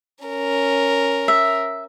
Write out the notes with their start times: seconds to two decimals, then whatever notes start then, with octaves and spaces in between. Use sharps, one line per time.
0.25 C#4 A#4
1.28 E5